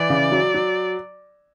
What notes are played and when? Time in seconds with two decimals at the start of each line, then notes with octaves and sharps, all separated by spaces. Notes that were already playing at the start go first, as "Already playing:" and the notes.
Already playing: E3 D5
0.10 C#3
0.32 F#3
0.54 F#3